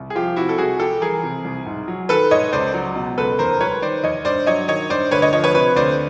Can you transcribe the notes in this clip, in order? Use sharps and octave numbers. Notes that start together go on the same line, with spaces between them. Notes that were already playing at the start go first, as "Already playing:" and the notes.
Already playing: C2
G#4
F3 F4 G4
C3 E4 F#4
A4
C2 F#4 G#4
G3 G4 A4
E3 G#4 A#4
C3
C2
G#2
F#3
D#3 A4 B4
G#2 C#5 D#5
C#2 C5 D5
F#3
B2
C#2 A4 B4
D#2 A#4 C5
G3 B4 C#5
D#3 C5 D5
D#2 C#5 D#5
G2 C5 D5
F#3 C#5 D#5
D#3 C#5 D#5
G2 C5 D5
D2 B4 C#5
C#5 D#5
F3 C#5 D#5
B4 C#5
C3 B4 C#5
D2 C5 D5